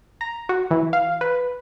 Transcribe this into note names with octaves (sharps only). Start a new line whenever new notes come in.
A#5
F#4
E3
F5
B4